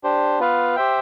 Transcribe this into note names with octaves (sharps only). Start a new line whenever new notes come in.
D4 G4 C5
B3 F4 B4 F5
G4 C5 E5 G5